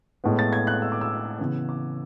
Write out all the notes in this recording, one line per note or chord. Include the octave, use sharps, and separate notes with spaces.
A2 G#3 B3
A6
G#6
F#6
E6
D6
E6
C#3 E3 B3
D6